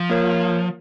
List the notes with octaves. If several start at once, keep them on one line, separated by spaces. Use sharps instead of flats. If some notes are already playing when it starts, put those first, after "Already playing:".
Already playing: F3
A#3 F4 A#4 C#5